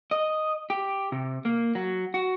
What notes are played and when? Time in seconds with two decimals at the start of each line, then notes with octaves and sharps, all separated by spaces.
0.11 D#5
0.70 G4
1.12 C3
1.45 A#3
1.75 F#3
2.14 F#4